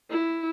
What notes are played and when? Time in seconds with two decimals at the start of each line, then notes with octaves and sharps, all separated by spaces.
0.10 E4